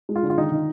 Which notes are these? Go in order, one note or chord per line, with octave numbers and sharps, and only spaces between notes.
G#3
F4
D3
F4
D#3 D#4
D#3